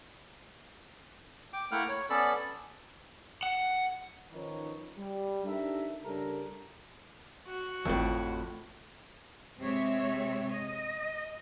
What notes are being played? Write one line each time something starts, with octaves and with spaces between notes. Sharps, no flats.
G5 D6
A3 A#3 E4 F#5 G5 F6
C#5
B3 C#4 A4 D5 B5 E6
F#5
D#3 F3 C#4 D#4 B4 C#5
G3
D4 D#4 G4 A4 A#4 E5
C#3 G3 D4 A4 A#4
F#4
G#1 F2 A2
C3 G#3 C4 C#5 E5
D#5